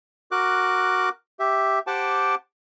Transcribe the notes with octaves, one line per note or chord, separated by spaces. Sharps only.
F#4 A#4 D6 F#6
G4 E5
G4 C5 F#5 G5 A5 D6